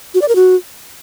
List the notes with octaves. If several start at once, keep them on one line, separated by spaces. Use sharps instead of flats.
F#4
D5
A#4
F#4